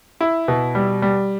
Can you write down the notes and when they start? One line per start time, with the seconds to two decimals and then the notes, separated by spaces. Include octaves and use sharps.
0.21 E4
0.48 B2
0.75 G3
1.02 G3